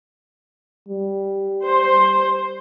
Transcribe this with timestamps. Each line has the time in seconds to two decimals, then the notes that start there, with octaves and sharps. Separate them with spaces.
0.88 G3
1.63 C5